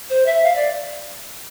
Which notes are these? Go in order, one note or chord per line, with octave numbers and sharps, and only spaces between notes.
C5
E5
F5
D5